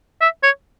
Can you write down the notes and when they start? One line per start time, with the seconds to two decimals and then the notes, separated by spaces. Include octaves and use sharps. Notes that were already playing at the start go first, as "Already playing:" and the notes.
0.21 E5
0.43 C#5